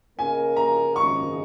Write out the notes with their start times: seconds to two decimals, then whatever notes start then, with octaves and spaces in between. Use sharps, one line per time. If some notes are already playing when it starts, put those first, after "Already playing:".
0.18 C#3 A#3 D#4 A#4 G#5
0.56 A#5
0.95 G#1 F#2 C#3 G#3 D#4 C#6